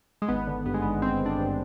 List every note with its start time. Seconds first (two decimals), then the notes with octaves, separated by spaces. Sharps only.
0.22 G#3
0.29 G#1 B3
0.47 D3
0.66 G2 B3
0.74 G#3
0.82 G#1 B3
1.02 G#1 C4
1.21 D3
1.26 D4
1.38 G2